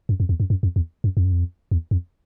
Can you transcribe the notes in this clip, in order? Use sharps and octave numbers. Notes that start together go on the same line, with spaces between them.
F#2
F2
E2
F#2
F#2
F2
E2
F#2
F2
F#2
F2
E2
F2